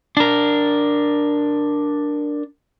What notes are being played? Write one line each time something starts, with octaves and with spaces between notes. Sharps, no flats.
D4 A#4